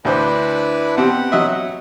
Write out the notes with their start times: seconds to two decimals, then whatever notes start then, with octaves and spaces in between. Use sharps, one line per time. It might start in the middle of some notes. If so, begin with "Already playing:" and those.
0.05 D2 D4 E4 B4 C5
0.97 B2 C4 G4 F#5
1.32 F#3 D#5 E5